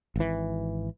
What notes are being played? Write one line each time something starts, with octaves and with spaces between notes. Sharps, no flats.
G#1 E3